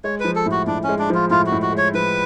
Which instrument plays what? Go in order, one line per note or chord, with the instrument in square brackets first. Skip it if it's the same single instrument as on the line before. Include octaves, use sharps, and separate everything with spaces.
[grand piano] G#3 [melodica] C#5
[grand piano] F3 [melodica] B4
[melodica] A4
[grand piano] A2
[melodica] F#4
[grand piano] A2 [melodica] D4
[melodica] C#4
[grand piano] G#3
[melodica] D4
[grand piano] F3 [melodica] F4
[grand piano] A2 [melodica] F4
[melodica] F#4
[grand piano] A2
[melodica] F#4
[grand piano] G#3
[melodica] C#5
[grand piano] F3 [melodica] B4